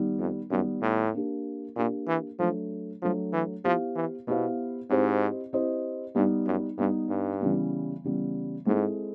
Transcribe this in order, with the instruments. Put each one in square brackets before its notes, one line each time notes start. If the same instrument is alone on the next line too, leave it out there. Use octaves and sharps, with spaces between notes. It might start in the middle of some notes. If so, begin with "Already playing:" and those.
Already playing: [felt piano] D#3 G3 B3
[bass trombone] F2
[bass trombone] F#2 [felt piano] D#3 G3 B3
[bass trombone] A2
[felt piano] A#3 D4 G4
[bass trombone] A#2 [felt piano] A#3 D4 G4
[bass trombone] E3
[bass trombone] F3 [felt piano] F#3 A3 D4
[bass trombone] F3 [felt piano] F#3 A3 D4
[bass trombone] E3
[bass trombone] F3 [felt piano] B3 E4 G4 C5 F5
[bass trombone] E3
[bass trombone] B2 [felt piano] B3 E4 G4 C5 F5
[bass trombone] G#2 [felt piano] C4 E4 G4 C5 D#5
[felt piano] C4 E4 G4 C5 D#5
[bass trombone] G2 [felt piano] G3 B3 D#4
[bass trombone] F#2
[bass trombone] G2 [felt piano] G3 B3 D#4
[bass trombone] G2
[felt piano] C#3 E3 G3 B3
C#3 E3 G3 B3
[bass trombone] G#2 [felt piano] G#3 C4 E4 A4